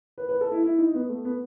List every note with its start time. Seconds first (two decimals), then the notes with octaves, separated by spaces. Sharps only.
0.18 B4
0.29 B4
0.41 A4
0.52 E4
0.63 E4
0.78 D#4
0.94 B3
1.09 A3
1.25 B3